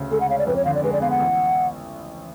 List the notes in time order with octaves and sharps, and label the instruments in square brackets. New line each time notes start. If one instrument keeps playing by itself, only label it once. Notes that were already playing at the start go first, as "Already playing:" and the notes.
Already playing: [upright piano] D2 C#3
[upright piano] G#3 [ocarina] A4
[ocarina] F#5
[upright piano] C#4 [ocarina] F5
[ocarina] D5
[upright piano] F2 [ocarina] B4
[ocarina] C#5
[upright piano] D3 [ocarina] F5
[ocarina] D5
[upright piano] G#3 [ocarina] B4
[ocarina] D5
[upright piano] B3 [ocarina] F5
[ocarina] F#5
[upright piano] A1